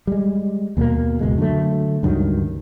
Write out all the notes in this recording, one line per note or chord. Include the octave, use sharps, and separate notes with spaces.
G3 G#3
D#2 B2 G3 A#3
F#1 C#2 B2 G#3
D3 F#3 A3
C#2 G2 D#3 F#3